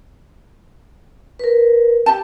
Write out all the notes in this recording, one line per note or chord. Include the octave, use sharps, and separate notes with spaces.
A#4 B4
G4 A5